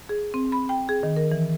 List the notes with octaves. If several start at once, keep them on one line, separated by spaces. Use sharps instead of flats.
G#4
C4
B5
G5
G#4
D#3
A#4
E3